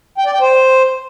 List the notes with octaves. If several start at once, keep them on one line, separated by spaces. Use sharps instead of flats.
G5
D5
G5
C5